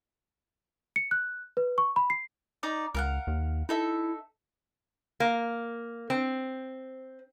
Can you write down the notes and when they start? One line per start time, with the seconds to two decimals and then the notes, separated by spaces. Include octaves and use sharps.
0.96 C#7
1.11 F#6
1.57 B4
1.78 C#6
1.96 B5
2.10 C7
2.63 D#4 D5 A#5
2.95 C#2 A#4 F5 F#5
3.27 D#2
3.69 D#4 E4 A4 E5
5.20 A#3
6.10 C4